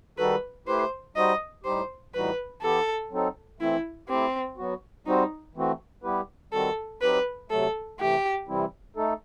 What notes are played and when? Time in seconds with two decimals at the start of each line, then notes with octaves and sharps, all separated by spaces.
0.18 D#3 G3 D#4 F#4 A4 B4
0.67 A3 E4 G4 B4 C5
1.16 G3 D#4 F#4 C5 D#5
1.64 A2 G3 D#4 G4 C5
2.14 A2 E3 G3 D#4 F#4 B4
2.62 E3 B3 E4 G4 A4
3.11 F#3 C4 D#4 A4
3.60 E3 A3 C4 E4
4.09 A3 C4 E4 G4
4.57 F#3 B3 F#4
5.06 G3 C4 D#4 F#4 C5
5.55 E3 A3 C4 F#4
6.03 G3 B3 E4 G4 B4
6.53 D#3 G3 C4 F#4 A4
7.02 F#3 C4 D#4 G4 B4
7.50 C3 F#3 A3 A4
7.99 C3 E3 A3 G4
8.48 C3 E3 G3 C4 E4
8.96 A3 D#4 A4